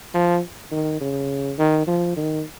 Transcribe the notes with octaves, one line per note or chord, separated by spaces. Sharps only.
F3
D#3
C#3
D#3
F3
D#3